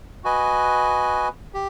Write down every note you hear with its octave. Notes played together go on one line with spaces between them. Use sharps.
F#4 B4 D#5 G#5
G4